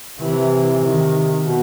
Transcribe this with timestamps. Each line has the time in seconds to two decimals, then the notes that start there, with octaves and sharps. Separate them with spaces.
0.19 C3 E3
0.81 D#3
1.43 B2